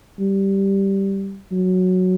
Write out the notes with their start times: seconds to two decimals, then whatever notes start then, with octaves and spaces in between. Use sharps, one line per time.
0.19 G3
1.52 F#3